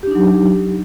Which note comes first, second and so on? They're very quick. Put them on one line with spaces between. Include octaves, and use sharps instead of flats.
G4 D4 D#4 F#3